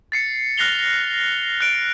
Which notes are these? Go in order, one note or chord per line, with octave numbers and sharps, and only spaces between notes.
A6 C7 C#7
F6 F#6 A#6 C7 F7 G7
F#6 D7